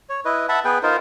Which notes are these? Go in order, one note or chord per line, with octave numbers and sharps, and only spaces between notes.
C#5
E4 B4 D#5
E5 F#5 A5 B5
B3 G#4 B4 G5
D#4 F4 A#4 C5